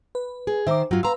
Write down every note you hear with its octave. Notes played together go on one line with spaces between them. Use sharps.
B4
G#4
D#3 C5 E5 A#5 D6
G2 F#3 F4
B4 F5 A#5 C6 E6